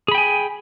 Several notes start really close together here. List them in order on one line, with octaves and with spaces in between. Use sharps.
G#4 B5 G5 G#5